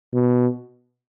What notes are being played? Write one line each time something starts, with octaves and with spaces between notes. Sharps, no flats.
B2